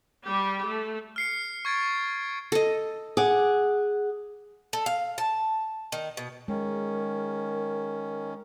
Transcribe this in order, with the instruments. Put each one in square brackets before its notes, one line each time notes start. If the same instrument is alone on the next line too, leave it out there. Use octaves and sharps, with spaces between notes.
[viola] G3 G4
A3
[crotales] F6 C7 C#7
C#6 G#6 A6 D7
[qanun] A4 D#5
[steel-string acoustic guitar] G#4 F#5 [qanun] D6
[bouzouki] A4
F5
A5
D#3
B2
[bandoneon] D#3 C#4 [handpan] G#3 [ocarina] A#4